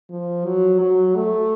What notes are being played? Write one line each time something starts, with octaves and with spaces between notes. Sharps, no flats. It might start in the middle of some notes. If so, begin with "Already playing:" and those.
F3
F#3
F#3
A3